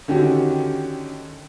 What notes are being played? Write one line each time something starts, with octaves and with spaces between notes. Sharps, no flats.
D3 D#3 C#4 F#4 G4